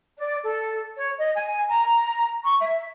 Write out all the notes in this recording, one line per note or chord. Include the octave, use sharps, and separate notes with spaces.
D5
A4
C#5
D#5
G#5
A#5
C#6
E5